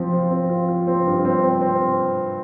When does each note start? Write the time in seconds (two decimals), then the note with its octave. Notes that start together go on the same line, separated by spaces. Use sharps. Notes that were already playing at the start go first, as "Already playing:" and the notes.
Already playing: F3 C4
0.13 F4
0.31 C4
0.49 F4
0.69 F4
0.87 C4
1.06 G2
1.25 C4
1.44 C4
1.62 C4